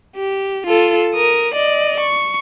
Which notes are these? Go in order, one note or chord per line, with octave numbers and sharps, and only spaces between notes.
G4
F4 A4
A#4 D#6
D5 D#5
C#6